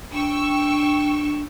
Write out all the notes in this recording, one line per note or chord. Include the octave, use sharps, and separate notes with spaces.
D4 G5 C#6 E6